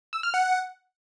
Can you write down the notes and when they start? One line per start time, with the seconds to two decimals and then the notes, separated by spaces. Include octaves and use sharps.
0.13 E6
0.23 F6
0.34 F#5